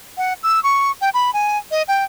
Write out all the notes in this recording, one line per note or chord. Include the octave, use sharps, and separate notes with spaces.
F#5
E6
C#6
G5
B5
G#5
D#5
G5